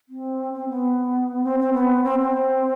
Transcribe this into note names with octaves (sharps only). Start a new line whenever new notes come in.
C4
C4
B3
C4
C4
B3
C4
C4